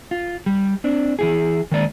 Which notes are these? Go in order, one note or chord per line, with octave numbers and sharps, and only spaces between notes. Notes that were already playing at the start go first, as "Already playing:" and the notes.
F4
G3
C4 D4
E3 E4 G#4
D#3 G#3 A#3 D5